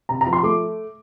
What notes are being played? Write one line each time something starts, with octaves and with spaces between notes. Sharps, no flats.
C3 A#5
A#5
F3
C6
A3 D6